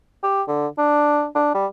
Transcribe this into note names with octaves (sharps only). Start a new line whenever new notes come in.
G4
D3
D4
D4
G3